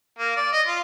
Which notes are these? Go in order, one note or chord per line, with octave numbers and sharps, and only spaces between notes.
A#3
D5
D#5
F4